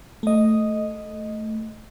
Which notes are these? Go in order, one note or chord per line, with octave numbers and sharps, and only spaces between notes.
A3 D#5